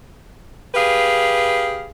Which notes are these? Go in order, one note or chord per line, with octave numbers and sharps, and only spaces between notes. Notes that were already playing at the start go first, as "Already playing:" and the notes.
G4 G#4 B4 F5